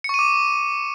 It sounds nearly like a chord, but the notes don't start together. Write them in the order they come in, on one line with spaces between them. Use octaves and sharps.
C#7 C#6 D#7 D6